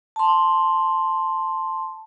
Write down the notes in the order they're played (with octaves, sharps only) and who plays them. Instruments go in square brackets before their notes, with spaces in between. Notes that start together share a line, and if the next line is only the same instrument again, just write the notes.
[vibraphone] A5 C6